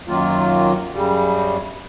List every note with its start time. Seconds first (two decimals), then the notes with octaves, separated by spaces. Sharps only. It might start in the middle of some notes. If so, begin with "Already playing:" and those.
0.08 F#2 D#3 F#3 A#3 F4
0.93 F#2 C#3 G3